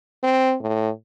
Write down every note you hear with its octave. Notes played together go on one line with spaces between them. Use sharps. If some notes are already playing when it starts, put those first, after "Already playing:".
C4
A2